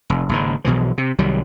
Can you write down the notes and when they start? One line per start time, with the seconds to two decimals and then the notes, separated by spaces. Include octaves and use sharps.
0.10 F1
0.29 F#1 G#2 D#3
0.65 B1 B2 E3 F3
0.98 C3
1.19 C2 D#3 F#3 G3